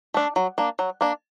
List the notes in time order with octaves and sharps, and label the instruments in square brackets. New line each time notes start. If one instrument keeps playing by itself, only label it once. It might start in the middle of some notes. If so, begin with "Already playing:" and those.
[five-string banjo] A3 D4
F#3
A#3 D4
F#3
A#3 D4